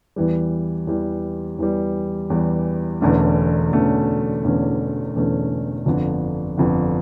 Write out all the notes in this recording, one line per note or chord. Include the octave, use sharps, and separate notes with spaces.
E2 E3 G3
E2 E3 G3
E2 E3 G3
E2 E3 G3
E1 E2 D3 A3 C#4
E1 E2 D3 A3 C#4
E1 E2 D3 A3 C#4
E1 E2 D3 A3 C#4
G1 F2 D3
G1 F2 D3